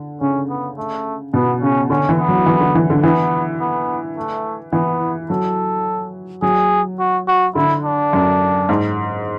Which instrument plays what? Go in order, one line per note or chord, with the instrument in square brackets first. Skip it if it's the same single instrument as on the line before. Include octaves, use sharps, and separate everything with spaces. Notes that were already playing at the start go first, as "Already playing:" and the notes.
Already playing: [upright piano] D3
[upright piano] C#3 [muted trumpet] C#4
[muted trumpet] B3
A3
[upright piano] B2 [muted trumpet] B3
[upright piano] C#3 [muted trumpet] C#4
[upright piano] D3 [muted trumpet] C#4
[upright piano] E3
[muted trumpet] B3
[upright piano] F#3
E3
D3
E3
D3
[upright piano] E3 [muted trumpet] B3
[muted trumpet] B3
A3
[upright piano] E3 [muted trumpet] B3
[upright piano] F#3 [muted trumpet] A4
[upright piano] F#3 [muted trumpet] G#4
[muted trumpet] F#4
F#4
[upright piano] D3 [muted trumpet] E4
[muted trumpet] D4
[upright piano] F#2
G#2